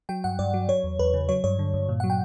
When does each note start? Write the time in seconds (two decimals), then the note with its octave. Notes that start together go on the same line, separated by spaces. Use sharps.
0.09 F#3 G5
0.24 G2 F#5
0.39 G2 D5
0.54 F#3
0.69 F#3 C#5
0.84 E2
0.99 E2 B4
1.14 C#3
1.29 F#3 C#5
1.44 G2 C#5
1.59 D3
1.74 G2
1.89 A#2
2.00 F#3 F#5
2.10 G5